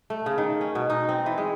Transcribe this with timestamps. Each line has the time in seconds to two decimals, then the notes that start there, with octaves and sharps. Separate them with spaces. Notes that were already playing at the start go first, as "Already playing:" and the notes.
0.10 A3
0.26 C#3
0.38 D#3
0.61 C#4
0.75 B2
0.90 D#4
1.09 C4
1.26 E3
1.38 G#3